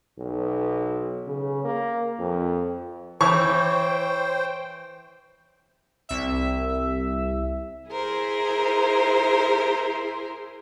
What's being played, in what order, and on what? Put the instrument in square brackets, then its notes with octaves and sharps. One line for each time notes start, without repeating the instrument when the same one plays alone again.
[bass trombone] B1
C#3
A#3
F2
[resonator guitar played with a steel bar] E3 [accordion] C5 G5 [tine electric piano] C#5 [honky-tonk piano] C#6
[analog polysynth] C2 E5
[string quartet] E4 G#4 A#4 C5